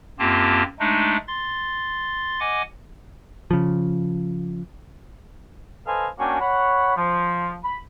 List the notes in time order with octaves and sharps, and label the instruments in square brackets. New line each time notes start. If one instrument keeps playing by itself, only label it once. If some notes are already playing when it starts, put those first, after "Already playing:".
[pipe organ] F#2 A#3 C4 F4 G4 A5
G#3 A3 D4 D#4
C6 A6
D#5 F#5 G#5 D6
[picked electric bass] C#3 F3
[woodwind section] A4 B4 C5 D#5 F5 G#5
A#3 C#4 D4 F#4 G5 G#5
C#5 F#5 B5
F3
B5